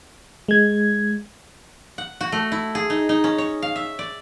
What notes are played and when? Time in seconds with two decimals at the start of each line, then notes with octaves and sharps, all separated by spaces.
0.48 G#3 G#6
1.98 F#5
2.21 F#4
2.32 A3
2.52 E4
2.75 G#4
2.90 D#4
3.09 D#4
3.24 C#4
3.38 C#5
3.62 F5
3.76 E5
3.99 D5